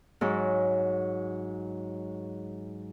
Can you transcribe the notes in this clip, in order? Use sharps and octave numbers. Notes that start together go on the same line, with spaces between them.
G#2 F#3 G#3